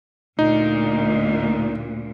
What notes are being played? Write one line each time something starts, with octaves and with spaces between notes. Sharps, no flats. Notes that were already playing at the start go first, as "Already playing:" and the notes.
D2 A#2 D#4